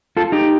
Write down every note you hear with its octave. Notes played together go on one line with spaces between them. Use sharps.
F4 A4
D#4 G4